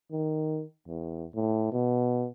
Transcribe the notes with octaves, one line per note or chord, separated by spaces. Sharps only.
D#3
E2
A2
B2